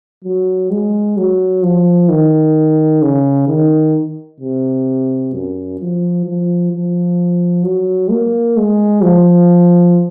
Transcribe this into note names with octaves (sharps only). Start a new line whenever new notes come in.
F#3
G#3
F#3
F3
D#3
C#3
D#3
C3
F#2
F3
F3
F3
F#3
A#3
G#3
F3